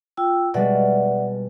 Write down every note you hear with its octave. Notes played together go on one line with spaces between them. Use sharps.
F4 G5 E6
B2 G3 G#3 D5 E5 F#5